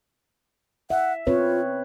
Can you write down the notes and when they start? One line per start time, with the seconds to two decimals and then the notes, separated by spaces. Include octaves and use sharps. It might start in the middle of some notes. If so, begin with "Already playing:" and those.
0.90 E5 F#5
1.27 C4 F4 B4 C#5